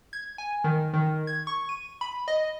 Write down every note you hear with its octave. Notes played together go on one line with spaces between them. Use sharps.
G#6
G#5
D#3
D#3
G#6
C#6
D#7
B5
D#5